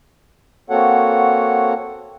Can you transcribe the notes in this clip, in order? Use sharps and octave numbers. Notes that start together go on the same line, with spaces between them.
A#3 C4 F#4 A4 C#5 F#5